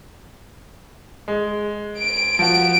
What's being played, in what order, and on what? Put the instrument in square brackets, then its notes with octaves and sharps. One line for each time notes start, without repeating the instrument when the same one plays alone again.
[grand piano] G#3
[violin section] D7
[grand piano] F3 F#4 [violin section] D7